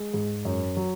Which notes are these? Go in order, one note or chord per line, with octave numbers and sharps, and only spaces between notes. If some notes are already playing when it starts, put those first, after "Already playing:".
Already playing: G#3
G#2
F#2
F#3